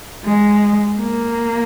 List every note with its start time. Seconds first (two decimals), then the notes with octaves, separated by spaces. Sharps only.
0.25 G#3
0.99 A#3